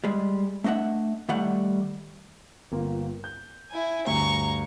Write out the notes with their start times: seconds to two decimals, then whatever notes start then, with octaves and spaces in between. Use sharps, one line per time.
0.04 G3 G#3
0.64 A3 D4 D#5 E5 F#5
1.29 D#3 G3 A3 F#5
2.72 G1 A#3 F4
3.24 G6
3.71 E4 G#5
4.07 D2 G2 A#5 C#6